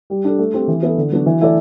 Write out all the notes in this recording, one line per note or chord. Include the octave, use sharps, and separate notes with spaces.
G3
D4 A4
A3
C4 G4
E3
B3 E4 A4
D3
F#3 B3 D4 F#4
E3
A3 E4 A4 D5